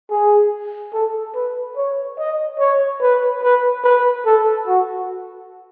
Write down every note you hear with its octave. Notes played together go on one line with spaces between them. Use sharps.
G#4
A4
B4
C#5
D#5
C#5
B4
B4
B4
A4
F#4